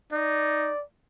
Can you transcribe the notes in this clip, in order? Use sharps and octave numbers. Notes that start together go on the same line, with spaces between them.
D#4 D5